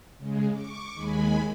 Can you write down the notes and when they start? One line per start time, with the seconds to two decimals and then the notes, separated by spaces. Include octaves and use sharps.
0.18 C#3 G#3
0.51 C#6 D6
0.94 D#2 G#3 G#5 B5